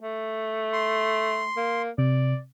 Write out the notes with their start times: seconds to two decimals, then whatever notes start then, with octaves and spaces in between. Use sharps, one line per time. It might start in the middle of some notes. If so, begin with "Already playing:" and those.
0.02 A3
0.73 C6
1.57 A#3
1.98 C3 D5